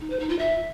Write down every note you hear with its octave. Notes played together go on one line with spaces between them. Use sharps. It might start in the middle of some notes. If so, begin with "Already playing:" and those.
D#4
C5
D#4
F4
E5